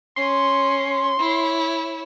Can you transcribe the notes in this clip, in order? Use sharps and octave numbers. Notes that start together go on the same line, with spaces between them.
C#4 C6
E4 C#5